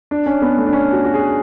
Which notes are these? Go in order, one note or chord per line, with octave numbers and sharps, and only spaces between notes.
D4
C#4
B3
A3
D4
C#4
F#4
F#4
G#4